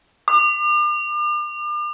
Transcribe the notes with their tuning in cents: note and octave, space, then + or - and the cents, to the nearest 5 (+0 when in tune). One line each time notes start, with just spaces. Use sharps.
D6 +40